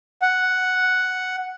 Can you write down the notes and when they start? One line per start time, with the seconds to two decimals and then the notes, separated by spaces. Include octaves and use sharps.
0.22 F#5